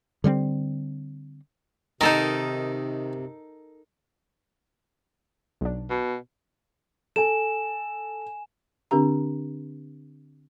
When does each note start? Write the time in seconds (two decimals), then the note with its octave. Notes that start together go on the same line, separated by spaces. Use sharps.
0.24 D3 G3 A3 C4
2.01 C3 D#3 D#4 A4 A#4
5.61 B1 D4
5.90 B2
7.16 A4 G#5 E7
8.91 D3 C4 D4 G4 A#5